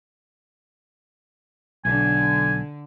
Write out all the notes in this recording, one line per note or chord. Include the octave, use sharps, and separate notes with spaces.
B1 D3 G#5